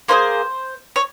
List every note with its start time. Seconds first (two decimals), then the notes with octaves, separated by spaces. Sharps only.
0.08 A#3 D#4 G#4 C5
0.96 C#5